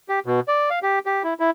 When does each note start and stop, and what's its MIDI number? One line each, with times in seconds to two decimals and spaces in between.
0.09 0.19 67
0.26 0.40 47
0.48 0.69 74
0.70 0.79 77
0.83 0.99 67
1.06 1.23 67
1.24 1.34 64
1.40 1.50 64